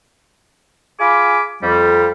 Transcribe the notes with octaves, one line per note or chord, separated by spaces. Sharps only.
F4 G#4 F5 G#5 B5 D6
F2 G3